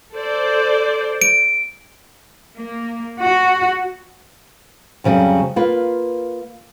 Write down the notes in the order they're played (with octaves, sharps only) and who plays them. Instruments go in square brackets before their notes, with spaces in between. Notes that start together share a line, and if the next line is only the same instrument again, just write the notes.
[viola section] A4 C5 D5
[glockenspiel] D7
[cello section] A#3
F#4
[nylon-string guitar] F2 C#3 F#3 G3
A#3 F4 B4